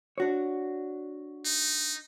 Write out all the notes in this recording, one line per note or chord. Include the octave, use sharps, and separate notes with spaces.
D4 F#4 C#5
D#4